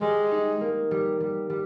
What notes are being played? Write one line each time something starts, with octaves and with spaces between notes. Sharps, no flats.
G3 G#3
D#4
A#3
G3
G3
G3